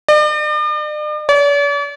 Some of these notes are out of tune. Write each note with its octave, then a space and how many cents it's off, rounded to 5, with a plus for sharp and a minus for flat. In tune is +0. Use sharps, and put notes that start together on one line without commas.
D5 +45
D5 -45